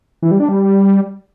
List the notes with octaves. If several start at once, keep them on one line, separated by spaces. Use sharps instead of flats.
E3
G3
D4
G3